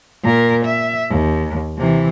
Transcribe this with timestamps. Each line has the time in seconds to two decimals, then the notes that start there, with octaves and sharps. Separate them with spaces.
0.23 A#2 A#4
0.65 E5
1.10 D#2
1.78 C3 E3